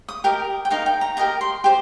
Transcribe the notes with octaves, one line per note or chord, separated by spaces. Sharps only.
D#6
G4 A#4 D#5
G5
D#4 A#4 D#5 F5
G5
A#5
G4 A#4 D#5 A#5
C6
G4 C5